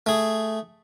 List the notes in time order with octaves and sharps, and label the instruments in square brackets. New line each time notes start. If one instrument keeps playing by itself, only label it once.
[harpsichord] A3 G#4